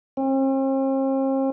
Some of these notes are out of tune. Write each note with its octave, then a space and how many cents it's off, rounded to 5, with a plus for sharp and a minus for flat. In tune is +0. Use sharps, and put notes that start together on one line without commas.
C4 +45